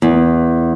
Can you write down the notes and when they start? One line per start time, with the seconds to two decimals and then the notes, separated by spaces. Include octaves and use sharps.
0.02 E2